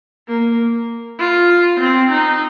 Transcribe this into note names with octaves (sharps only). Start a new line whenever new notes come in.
A#3
F4
C4
D#4